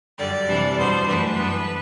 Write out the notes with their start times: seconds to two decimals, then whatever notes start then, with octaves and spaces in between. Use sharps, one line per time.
0.18 F#2 D3 G3 D5
0.48 C3 E3 G3 D4
0.77 E2 B2 G3 B3 D4 C5
1.07 F#2 E3 A3 D4 B4
1.37 F#2 E3 G3 B3 D4